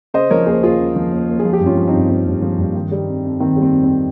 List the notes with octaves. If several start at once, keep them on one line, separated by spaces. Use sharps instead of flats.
C#3 C5 D#5
F3 A#4 C#5
D#2 G#4 C5
D#2 F4 G#4
C#3
F3
D#2
D#2
G#4
F3
G4
G2
C#4 F4
F3
C4 D#4
G2
F3
G2
F3
G2
D#3
G3
F2
F2
D#3 C4
G3
C4
F2
C4